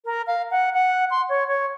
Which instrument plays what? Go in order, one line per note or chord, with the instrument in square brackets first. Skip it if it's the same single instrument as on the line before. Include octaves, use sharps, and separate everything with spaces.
[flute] A#4
F5
F#5
F#5
C6
C#5
C#5